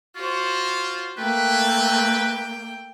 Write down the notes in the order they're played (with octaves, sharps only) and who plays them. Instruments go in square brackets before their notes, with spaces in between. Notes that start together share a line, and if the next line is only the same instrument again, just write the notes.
[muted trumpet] F4 [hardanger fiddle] F#4 C5
[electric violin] A3 A#3 [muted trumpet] B4 [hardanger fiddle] G5